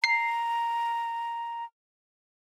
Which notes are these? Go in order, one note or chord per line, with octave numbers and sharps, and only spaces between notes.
A#5 C7